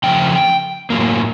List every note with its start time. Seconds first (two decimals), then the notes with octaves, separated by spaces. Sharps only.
0.04 C#3 F3 A3 G5
0.90 A2 F#3 A#3